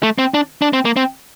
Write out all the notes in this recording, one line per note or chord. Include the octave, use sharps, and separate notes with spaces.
A3
C4
D4
D4
C4
A#3
C4